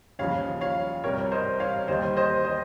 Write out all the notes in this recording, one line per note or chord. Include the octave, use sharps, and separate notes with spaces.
D#2 C#3 F3 C#5 F5
C#5 F5
C2 C3 G3 A#4 C#5
C5 D#5
C#5 F5
D#2 D#3 G3 C5 D#5
C5 D#5
C5 D#5